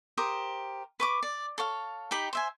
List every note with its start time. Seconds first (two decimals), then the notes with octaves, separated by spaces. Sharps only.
0.17 G4 A#4 C5 D#6
1.00 B4 C#6 D6
1.23 D5
1.58 A4 C#5 F5
2.11 D#4 G4 B5
2.33 C5 E5 G#5